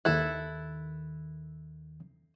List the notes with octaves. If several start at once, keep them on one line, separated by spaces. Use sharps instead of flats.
D#2 D#3 E4 A4 F#6